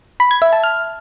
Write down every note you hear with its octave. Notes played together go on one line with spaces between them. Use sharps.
B5
G#6
E5
A5
F6